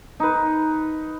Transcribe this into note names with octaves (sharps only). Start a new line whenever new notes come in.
D#4 B4